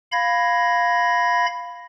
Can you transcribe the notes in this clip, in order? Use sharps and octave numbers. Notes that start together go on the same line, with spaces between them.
F5 B5 G#6 A#6